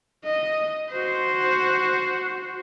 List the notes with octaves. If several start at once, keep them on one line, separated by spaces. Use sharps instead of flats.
D#5
F#4 C5